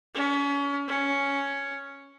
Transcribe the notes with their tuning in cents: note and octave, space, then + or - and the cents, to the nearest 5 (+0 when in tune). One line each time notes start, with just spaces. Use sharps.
C#4 +30
C#4 +5